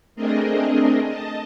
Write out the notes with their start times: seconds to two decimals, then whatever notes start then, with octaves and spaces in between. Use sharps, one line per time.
0.16 A3 C4 D4 G#4 A#4 D#5
1.04 D#5 A5